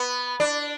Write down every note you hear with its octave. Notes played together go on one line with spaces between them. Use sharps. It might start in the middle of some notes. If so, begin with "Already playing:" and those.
Already playing: B3
D4